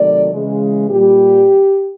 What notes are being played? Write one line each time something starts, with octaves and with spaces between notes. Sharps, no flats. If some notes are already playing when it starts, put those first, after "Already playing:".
Already playing: C3 D#3 F#3 A3 D5
C#3 E3 G#3
A#2 G3 G4